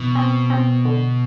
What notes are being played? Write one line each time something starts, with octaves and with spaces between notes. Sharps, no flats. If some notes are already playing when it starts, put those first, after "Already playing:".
Already playing: B2 E3
C4
C4
D3